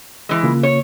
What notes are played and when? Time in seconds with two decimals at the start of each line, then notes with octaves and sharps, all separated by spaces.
0.29 E3 G#3
0.43 C#3 A#3 F4
0.63 C#5